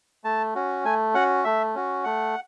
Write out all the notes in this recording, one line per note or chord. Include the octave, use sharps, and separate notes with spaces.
A3 A5
C#4 F#4
A3 G#5
C#4 F#4 F#5
A3 E5
C#4 F#4
A3 F#5